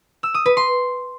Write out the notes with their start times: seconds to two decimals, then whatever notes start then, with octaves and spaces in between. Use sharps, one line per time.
0.23 E6
0.34 D#6
0.46 B4
0.57 C6